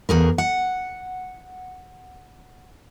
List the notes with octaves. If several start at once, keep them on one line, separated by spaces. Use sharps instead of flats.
E2 G#4 A#4
F#5